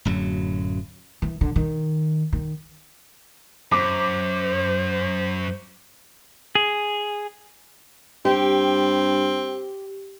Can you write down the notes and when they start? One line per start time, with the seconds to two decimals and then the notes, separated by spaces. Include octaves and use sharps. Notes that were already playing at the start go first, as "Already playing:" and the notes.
0.05 D1 F#2 F#3
1.22 E3
1.41 D3
1.56 D#3
2.33 D#3
3.72 F#2 C5 D6
6.55 G#4
8.25 G2 C4 G4